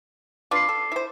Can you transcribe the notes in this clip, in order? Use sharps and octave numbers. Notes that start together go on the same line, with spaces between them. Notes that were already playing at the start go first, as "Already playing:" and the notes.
D4 F4 B4 D6 C7
A4
E4 C5